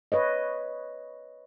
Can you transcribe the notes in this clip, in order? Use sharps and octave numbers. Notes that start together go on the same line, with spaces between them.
B4 C#5 D#5